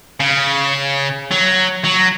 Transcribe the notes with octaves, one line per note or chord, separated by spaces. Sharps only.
C#3
F#3
F#3